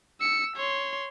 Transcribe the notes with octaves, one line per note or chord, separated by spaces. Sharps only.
E6 C#7
C#5 C6